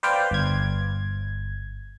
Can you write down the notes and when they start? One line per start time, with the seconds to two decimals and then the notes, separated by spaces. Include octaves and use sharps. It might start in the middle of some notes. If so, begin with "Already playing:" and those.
0.03 B4 C5 D5 F5 G5
0.31 G1 G#6